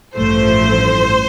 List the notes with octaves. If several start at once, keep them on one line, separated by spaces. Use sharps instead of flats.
A1 G2 F3 A3 C5